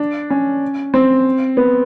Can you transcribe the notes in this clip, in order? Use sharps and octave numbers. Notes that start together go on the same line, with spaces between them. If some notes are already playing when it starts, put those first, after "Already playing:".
Already playing: D4
C#4
C4
B3